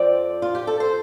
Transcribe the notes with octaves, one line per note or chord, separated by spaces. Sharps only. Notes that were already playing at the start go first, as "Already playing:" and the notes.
Already playing: F2 F3 C4 D5 G5
F4
G4
A4
C5